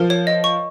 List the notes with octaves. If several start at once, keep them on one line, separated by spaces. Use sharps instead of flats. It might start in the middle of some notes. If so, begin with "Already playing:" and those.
Already playing: F3 A#4
C#5
D#5
C#6